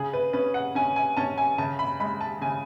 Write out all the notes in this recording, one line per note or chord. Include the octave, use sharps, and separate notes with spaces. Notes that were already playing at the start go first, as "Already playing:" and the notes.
Already playing: C#3 G#4
B4
C#4 B4
F#5
C#4 G#5
G#5
C#4 A5
G#5
C#3 A5
B5
G#3 B5
A5
C#3 G#5